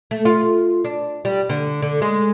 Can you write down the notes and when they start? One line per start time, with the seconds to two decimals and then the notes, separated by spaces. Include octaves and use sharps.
0.11 A3
0.25 F4
0.85 D4
1.25 G3
1.50 D3
1.82 D3
2.02 G#3